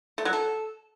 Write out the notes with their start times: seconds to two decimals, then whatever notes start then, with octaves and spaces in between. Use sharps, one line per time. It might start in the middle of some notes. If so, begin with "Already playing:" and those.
0.18 A3
0.25 F#3
0.33 A4